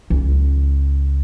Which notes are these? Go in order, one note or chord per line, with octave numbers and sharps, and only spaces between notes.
C#2